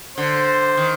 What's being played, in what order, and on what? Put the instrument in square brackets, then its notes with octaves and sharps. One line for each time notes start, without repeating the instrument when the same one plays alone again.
[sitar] D3 [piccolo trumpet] C5
[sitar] D#3